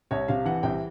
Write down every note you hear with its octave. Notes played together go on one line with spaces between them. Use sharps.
C2 C#5
C3 F5
E3 F#5
C2 G5